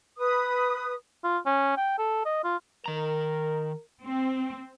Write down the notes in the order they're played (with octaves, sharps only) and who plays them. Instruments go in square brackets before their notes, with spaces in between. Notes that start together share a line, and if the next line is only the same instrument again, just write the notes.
[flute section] B4 D#6
[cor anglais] F4
C#4
G5
A4
D#5
F4
[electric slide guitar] D#3 A#5 [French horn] A#4
[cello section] C4